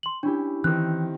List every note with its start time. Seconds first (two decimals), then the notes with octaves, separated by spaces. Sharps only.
0.03 C6 F#7
0.23 C#4 D4 E4 G4
0.64 D#3 E3 C4 F#6